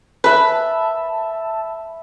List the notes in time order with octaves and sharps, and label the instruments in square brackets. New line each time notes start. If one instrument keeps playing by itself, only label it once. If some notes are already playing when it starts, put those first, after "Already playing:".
[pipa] B4 [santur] E5 B5 [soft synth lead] A5